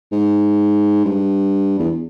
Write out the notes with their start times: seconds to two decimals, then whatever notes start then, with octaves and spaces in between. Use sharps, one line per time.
0.12 G#2
1.05 G2
1.79 E2